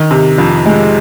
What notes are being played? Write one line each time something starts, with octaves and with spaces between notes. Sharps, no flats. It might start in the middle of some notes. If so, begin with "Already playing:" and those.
Already playing: D#3
C3
F2
G#3